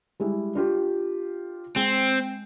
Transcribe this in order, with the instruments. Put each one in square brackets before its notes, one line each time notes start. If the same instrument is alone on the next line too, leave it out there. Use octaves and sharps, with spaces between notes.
[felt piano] G3 G#3 E4
D4 F4 G4
[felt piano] G#3 G5 [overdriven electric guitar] C4